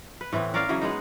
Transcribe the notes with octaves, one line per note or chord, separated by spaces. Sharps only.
B4
A2 E3 B3 C4
C#4 A#4 D5 F5
C#3 E3 F#3 G#4
G#3 B3 D#4